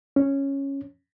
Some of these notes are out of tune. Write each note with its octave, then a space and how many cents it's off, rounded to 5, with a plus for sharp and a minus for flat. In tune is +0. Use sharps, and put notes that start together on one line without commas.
C#4 -5